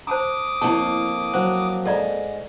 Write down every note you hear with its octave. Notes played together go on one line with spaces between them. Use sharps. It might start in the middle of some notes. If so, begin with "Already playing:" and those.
C5 A5 A#5 D6 D#6
F2 A#3 E4 A5
F#3 C5
G#2 A4 D5 A#5